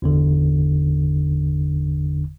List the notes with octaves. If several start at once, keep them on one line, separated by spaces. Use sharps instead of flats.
G1 E2 D3